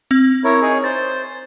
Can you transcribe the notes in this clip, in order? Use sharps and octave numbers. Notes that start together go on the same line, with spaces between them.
C4
E4 A#4 C#5
D#4 G#4 C#5
C5 A6